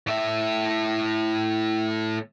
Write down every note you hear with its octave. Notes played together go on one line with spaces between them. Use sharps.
A2 E5